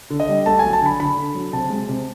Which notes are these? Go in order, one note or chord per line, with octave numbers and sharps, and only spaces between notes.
D3
D#5
G3
A3 A5
F#3 G#5
A5
D3 B5
D3 B5
D3
F#3
C3 A5
G#3
C3